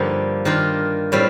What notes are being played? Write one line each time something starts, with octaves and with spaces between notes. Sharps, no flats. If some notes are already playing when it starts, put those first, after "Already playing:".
Already playing: G2 D3 F3 A#3 D#4
D#3 A#3 D4 F4
A2 G3 C4 F4